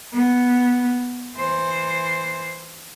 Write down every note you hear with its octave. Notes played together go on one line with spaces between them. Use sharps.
B3
E3 C5